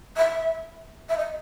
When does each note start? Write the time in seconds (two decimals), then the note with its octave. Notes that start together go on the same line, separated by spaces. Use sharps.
0.17 E5
1.09 E5
1.17 D#5